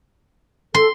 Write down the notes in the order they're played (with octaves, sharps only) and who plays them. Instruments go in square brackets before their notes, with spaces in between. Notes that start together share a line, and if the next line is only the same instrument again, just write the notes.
[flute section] A4 [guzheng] C6